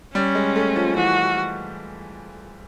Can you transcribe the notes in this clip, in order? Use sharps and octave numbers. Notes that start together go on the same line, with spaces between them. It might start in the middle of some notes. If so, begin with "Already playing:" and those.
G3 C#4
G#3
A3
F3
E3 F#4